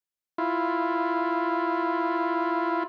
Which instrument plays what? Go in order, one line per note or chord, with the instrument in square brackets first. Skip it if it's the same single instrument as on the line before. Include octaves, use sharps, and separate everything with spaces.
[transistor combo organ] E4 F4